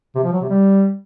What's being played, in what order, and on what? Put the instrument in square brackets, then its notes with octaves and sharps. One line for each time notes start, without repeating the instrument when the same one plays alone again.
[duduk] C3
F3
F#3
C3
G3